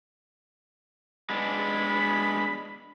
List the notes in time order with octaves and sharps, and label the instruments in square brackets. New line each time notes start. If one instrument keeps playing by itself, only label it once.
[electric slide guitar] G#3 B3 D4 [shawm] B5